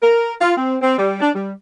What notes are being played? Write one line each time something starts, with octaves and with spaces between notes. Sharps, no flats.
A#4
F4
C4
C4
G3
D4
G3